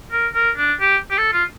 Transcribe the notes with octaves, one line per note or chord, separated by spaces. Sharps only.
A#4
A#4
D4
G4
G4
A4
F4